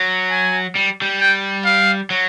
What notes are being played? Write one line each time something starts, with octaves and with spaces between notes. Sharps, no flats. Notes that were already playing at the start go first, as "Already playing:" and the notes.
Already playing: F#3
G#5
G3
G3
G5
F5
F#3